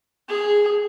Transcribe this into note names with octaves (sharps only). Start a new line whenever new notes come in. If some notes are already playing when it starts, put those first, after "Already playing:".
G#4